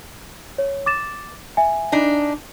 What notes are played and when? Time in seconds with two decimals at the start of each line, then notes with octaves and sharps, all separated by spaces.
0.58 C#5
0.86 D6 A6 E7
1.57 E5 G#5
1.92 D4 D#4